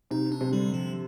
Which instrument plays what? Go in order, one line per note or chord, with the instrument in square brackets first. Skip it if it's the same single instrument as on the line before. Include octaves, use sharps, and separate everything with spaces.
[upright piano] C3 [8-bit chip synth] D#4
[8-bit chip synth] D4
[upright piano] C3
[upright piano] D3 [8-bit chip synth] G3
[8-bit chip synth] F3